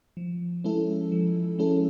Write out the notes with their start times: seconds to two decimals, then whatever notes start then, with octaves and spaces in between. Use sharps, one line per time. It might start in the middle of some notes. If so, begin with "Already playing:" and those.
0.17 F3
0.64 G#3 C#4 E4 A4
1.12 F3
1.59 G#3 C#4 E4 A4